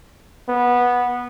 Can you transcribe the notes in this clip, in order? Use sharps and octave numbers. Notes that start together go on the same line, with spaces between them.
B3